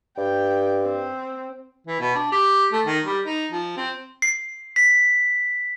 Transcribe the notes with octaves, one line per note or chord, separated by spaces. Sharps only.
G2 G5
C4
E3
B2
D4
G4
A3
D#3
G3
D#4
F3
C4
C7
B6